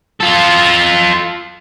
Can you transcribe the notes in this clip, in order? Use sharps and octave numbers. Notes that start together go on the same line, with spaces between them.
F4 A4